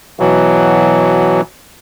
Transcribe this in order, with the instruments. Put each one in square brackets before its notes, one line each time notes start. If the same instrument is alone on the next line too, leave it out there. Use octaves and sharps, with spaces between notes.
[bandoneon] B2 E3 F#3